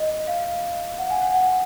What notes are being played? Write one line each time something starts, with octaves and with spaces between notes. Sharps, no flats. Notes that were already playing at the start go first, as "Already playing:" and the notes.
Already playing: D#5
F5
F#5
G#5
F#5
F#5